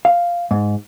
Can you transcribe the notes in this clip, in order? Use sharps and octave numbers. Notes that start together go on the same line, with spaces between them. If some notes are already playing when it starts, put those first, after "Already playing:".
F5
G#2